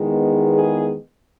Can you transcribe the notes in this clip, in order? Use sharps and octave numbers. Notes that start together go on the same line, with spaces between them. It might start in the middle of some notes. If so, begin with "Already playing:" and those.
Already playing: E2 D#3 G#3 B3
G#4